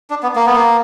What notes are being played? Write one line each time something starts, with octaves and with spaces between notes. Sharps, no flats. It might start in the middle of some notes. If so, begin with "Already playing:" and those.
D4
B3
A#3
B3
A#3